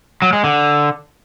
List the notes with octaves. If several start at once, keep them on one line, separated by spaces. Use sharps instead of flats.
F#3
G#3
D3